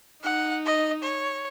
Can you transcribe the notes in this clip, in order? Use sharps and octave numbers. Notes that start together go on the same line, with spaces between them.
D#4 F#5
D#5
C#5